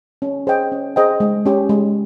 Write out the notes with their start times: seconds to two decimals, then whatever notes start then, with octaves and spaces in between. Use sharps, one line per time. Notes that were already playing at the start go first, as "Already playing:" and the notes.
0.22 C#4
0.47 G#4 C5 D#5 G5
0.72 C#4
0.96 G#4 C5 D#5 G5
1.20 G#3
1.46 C#4 G4
1.69 G#3